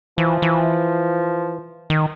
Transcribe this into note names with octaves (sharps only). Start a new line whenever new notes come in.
E3 F3
E3
D#3